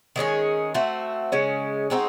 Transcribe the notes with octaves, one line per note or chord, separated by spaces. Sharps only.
D#3 G#3 C#4 G#4
A3 C4 F#4
C#3 G#3 C#4
G#3 C4 D#4 F#4